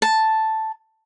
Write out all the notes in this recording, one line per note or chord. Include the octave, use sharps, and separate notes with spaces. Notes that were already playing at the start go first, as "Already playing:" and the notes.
A5